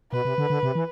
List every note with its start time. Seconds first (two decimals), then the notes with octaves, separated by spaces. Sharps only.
0.12 B2 B4
0.25 C3
0.38 D3
0.50 D3
0.63 C3
0.75 E3